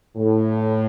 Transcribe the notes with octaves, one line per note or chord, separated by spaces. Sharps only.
A2